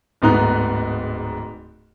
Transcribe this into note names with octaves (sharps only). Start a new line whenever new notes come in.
D1 G#2 B3 D#4 A#5 F#6